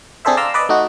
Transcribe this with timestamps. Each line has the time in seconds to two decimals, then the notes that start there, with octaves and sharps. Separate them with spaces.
0.25 C4 D4 G#4 A4 C5 E5
0.37 D5 F5 A#5 C6 E6
0.54 B4 D5 D#5
0.69 A3 D#4 F#4